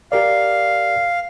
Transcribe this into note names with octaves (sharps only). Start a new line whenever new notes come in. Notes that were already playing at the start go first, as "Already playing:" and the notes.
G4 A#4 D5 F5